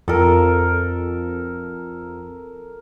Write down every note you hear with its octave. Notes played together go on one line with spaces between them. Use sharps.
F2 A4 A#4